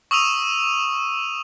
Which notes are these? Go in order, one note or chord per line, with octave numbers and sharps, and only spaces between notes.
C#6 D#6 E6 D#7 F7